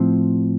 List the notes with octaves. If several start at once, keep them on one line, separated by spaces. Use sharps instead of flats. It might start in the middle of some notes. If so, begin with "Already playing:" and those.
Already playing: A2 F3 C4